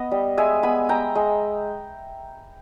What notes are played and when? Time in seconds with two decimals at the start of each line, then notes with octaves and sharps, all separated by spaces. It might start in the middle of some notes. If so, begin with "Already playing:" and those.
Already playing: B3 D#5
0.11 G3
0.37 G#3 E5 G#5
0.63 B3 G#5 B5
0.89 G#3 G5 A#5
1.15 G#3